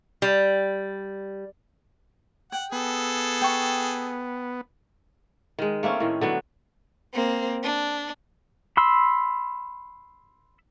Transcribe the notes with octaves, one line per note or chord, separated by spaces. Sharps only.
G3
F#5 G5
B3 G#4 A4
G5 C#6
D#3 G#3
A3 A#3 C4 C#4
A2 D#3
D3 F#3 B3
A#3 C4
D4
B5 C6 E6